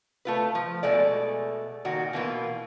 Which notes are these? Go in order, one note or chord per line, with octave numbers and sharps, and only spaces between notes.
A3 F4 B4
F3
B2 G#3 A3 D5
A#2 D#3 F#4
B2 E3 A#3 F4